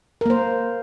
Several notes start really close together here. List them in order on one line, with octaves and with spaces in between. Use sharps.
A#4 A#3 C5